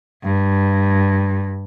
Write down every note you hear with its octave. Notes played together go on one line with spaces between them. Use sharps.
G2